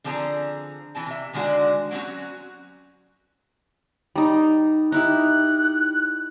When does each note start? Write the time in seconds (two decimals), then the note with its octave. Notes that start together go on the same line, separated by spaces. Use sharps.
0.04 D3 F3 C4 G#4 A#5
0.95 E3 C4 A5
1.06 C3 E5
1.33 D3 D#3 G#3 D4 F#4 G#4
1.91 F#3 C4 C#4 F#4
4.16 G3 D#4
4.92 D#4 E4 G4 F#6